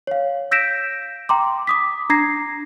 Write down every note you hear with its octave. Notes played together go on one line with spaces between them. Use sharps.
C#5 F5
E6 G6 A#6 B6 D7 E7
G5 A#5 C6 D6
D6 D#6 B6
D4 A#5 G#6 A#6 C7